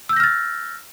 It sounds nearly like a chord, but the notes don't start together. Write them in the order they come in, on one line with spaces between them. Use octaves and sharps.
E6 G6 A#6 F6 A6